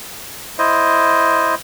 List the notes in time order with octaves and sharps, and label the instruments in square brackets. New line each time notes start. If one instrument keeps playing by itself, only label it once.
[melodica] E4 C5 D#5